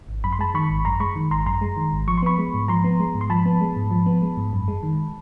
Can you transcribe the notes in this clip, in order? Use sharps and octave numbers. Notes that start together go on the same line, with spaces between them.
G#1
F#2 B5
C6
G#3 A5 B5
D#3 B5 C#6
G#1
F#2 A#5 C6
G#3 B5 C#6
D#3
G#1 A#5 C6
F#2 A#5 C6
G#3
D#3
G#1
F3 C#6
C6
B3 B5 C#6
G#3
G#2
F3 A#5 C6
B3
G#3
G#2
C6
F3 A5 B5
B3
G#3
G#2
F3
B3
G#3
G#2
F#2
G#3
D#3